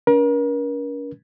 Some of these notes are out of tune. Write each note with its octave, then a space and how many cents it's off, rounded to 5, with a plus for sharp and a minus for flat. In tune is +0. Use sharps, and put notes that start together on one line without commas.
C#4 +45 A#4 +40